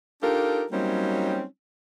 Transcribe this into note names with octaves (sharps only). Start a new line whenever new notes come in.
D4 D#4 F4 G4 A4 A#4
F#3 G3 A#3 C4 C#4 D#4